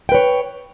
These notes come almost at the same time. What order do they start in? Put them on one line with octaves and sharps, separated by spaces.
G5 B4 C#5